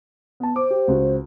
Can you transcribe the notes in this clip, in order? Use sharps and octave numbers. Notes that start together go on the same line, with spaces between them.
B3 A5
C5 D6
G4
C#2 F#4